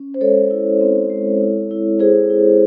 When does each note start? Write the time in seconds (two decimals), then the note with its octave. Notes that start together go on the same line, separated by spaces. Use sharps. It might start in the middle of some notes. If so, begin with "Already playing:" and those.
Already playing: C#4
0.14 C5
0.21 G#3 A4 C#5
0.51 E4
0.81 C4
1.10 G#3
1.41 E4
1.71 E4
2.00 E4 G#4 C5
2.30 E4